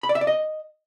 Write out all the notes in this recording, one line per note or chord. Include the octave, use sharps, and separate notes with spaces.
B5
D5
E5
D5
D#5